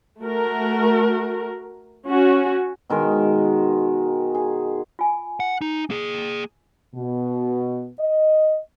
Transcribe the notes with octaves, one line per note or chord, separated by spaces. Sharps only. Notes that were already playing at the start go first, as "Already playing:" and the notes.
A3 F#4 A#4
C#4 F#4
B2 D#3 G#3 A#4
G#4
F4 G#5
F#5
D#4
A#3 G#4
B2
D#5